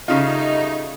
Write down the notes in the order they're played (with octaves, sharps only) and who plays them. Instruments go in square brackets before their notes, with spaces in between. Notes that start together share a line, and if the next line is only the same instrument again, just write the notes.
[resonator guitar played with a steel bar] C#3 F4 [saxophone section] G3 A3 D#4